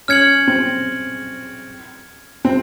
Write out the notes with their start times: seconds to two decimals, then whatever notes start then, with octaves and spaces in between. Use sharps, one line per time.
0.08 C#4 F6 G#6 C#7 F#7
0.47 C4
2.45 C4